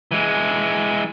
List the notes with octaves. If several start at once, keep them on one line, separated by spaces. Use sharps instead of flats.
E3 G#3